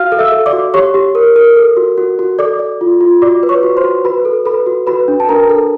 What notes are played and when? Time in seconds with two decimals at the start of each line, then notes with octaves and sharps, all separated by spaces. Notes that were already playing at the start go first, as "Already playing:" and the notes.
Already playing: F#4 F5 F6
0.12 A4
0.19 E5 E6
0.32 A4
0.46 D5 D6
0.53 F#4
0.74 G4 C#5 C#6
0.94 G4
1.15 A#4
1.36 A#4
1.56 A4
1.77 F#4
1.98 F#4
2.19 F#4
2.39 A4 D5 D6
2.59 D5
2.81 F4
3.01 F4
3.22 F#4 D5 D6
3.43 B4
3.49 C#5 C#6
3.63 F#4
3.77 C5 C6
3.84 F#4
4.04 F#4 B4 B5
4.25 A4
4.46 A4 B4 B5
4.67 F#4
4.87 F#4 B4 B5
5.08 D4
5.20 A5
5.29 D4 A#4 A#5
5.49 A4